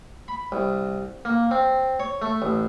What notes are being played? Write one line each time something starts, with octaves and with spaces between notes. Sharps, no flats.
B5
C2
A#3
C4
C#5
A3
A1